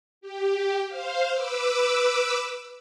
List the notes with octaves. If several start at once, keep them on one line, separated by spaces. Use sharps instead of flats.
G4
C5 F5
B4 D6 E6